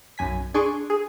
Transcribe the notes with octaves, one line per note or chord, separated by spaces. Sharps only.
B1 F#2 G#5 B6
D4 G#4 C6 C#6 D7 D#7
G#4